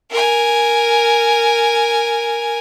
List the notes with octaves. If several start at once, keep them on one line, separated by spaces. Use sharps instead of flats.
A#4 G#5